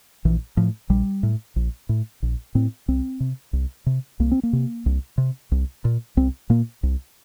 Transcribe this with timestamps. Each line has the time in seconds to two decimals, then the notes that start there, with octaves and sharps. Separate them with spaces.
0.25 A#1 E3
0.57 A2 F3
0.90 A#1 G3
1.23 A2
1.56 A#1
1.89 A2
2.22 A#1
2.55 A2 C4
2.88 C2 C4
3.20 C3
3.53 C2
3.86 C3
4.20 C2 A#3
4.32 C4
4.43 A#3
4.53 C3
4.86 C2
5.18 C3
5.52 C2
5.85 A#2
6.17 C2 C4
6.50 A#2 A#3
6.83 C2